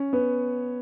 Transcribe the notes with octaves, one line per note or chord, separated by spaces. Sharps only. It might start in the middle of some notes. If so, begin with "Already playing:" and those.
Already playing: C#4
B3